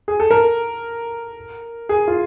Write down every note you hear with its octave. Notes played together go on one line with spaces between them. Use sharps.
G#4
A4
A#4
G#4
F4